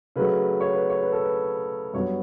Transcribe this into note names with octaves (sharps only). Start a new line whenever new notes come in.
C#3 F#3 A3 B4
C#5
B4
C#5
B4
A4
B4
G2 F#3 B3 C#5